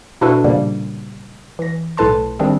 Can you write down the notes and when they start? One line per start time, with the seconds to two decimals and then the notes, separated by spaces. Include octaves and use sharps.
0.21 B2 D4 E4 F#4 A4 B4
0.44 A#2 C#3 F3 G3 A#3
1.59 E3 A#6
1.97 B1 A2 A4 B4 A5 C6
2.39 D#3 G3 C4 D4 G#4